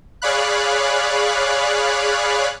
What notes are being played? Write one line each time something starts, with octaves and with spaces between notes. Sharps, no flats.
G#4 C#5 D5 F5 B5 F#6